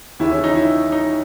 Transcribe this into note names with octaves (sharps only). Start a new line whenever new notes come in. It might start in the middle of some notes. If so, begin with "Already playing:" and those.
D#2 C#3 E3 E4
C#4
D#4
E4
D#4